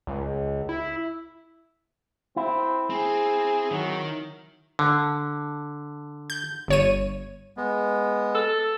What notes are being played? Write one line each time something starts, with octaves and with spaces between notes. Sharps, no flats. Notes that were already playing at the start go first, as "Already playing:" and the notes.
C#2
E4
C4 E4
C4 G#4
D#3 F#3
D3
G6
G1 C#5 D#7
G#3 B3
A4